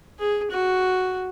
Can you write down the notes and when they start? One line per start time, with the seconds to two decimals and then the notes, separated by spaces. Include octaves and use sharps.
0.19 G#4
0.51 F#4